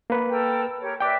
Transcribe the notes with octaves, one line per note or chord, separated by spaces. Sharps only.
A#3 B4
A4 A#4 G5
G4 A#4 C#5
B4 D5 E5 G5 D6